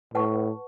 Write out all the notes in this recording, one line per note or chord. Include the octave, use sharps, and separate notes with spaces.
A2 B4 F#5 A5 C#6